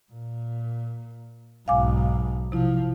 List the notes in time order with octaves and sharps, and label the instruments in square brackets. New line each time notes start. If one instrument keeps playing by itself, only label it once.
[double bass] A#2
[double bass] B1 G#2 [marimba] F5 G#5 D6
[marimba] C3 E4 [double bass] F3